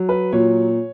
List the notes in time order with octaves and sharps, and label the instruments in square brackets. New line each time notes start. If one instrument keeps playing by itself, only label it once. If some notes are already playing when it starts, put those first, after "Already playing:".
Already playing: [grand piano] F#3
B4
A#2 C#5